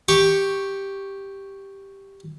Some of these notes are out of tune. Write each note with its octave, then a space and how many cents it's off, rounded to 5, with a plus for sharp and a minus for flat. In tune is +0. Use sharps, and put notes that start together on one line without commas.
G4 +0 C#6 +0